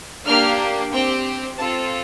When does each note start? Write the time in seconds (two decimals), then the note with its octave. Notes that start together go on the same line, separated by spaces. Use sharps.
0.26 A#3 D4 G4 F6
0.92 C4 G4 G5
1.58 C4 F4 A4 A5